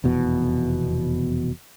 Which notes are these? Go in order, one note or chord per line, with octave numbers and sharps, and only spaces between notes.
F1 E2 B2